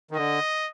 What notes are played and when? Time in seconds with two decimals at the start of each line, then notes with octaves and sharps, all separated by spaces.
0.11 D#3
0.16 D3 D#5